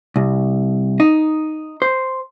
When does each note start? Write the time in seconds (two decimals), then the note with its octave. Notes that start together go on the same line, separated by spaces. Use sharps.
0.16 C2
1.00 D#4
1.82 C5